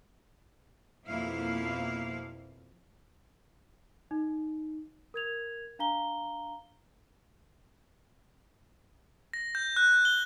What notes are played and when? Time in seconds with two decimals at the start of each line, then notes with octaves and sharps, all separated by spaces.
1.07 F2 B2 F3 A#3 E4 F5
4.11 D#4
5.14 A#4 G#6 F7
5.79 D4 F5 A#5 G7
9.33 A#6
9.55 G6
9.77 F#6
10.05 G7